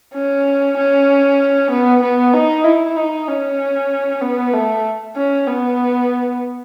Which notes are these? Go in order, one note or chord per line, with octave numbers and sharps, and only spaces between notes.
C#4
C#4
B3
B3
D#4
E4
D#4
C#4
B3
A3
C#4
B3